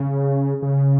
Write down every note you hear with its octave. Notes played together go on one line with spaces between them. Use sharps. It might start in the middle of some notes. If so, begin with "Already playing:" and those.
Already playing: C#3
C#3